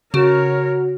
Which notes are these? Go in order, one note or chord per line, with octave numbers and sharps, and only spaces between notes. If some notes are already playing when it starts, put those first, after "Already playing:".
C#3 F#4 A#4 C#5